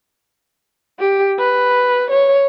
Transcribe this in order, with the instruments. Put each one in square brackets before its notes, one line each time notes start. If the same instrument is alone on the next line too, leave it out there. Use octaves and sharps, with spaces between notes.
[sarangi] G4
B4
C#5